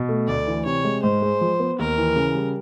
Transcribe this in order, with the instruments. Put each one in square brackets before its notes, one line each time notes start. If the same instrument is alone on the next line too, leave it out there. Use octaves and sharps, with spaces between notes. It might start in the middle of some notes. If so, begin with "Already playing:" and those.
Already playing: [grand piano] B2
A3
[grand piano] D2 [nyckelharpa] D5
[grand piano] E3
[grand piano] C3 [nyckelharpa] C#5
[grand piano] G#3
[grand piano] G#2 [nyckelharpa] C5
[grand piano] G#3
F3
B3
[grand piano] D#2 [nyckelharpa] A#4
[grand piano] E3
C#3
G3